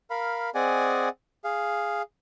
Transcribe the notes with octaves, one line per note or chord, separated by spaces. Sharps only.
A#4 F5 B5
C4 G#4 D5 D#5 F#5 G#5
G#4 F5